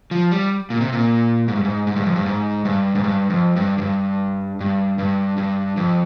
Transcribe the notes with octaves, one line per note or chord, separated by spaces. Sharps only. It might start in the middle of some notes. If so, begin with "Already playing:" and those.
F3
G3
A#2
C3
A#2
G#2
G2
G#2
G#2
G2
F2
G2
G#2
G2
G#2
G2
F2
G2
F2
G2
G2
G2
G2
F2